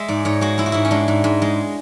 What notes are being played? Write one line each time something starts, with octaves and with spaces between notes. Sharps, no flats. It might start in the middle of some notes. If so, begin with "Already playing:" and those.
Already playing: G#3 E5
G#2 D5
G#2 C#5
G#3 F#4
G#3 E4
F#4
G#2 E4
C#4
G#3 D4
G#2
G#2
G#3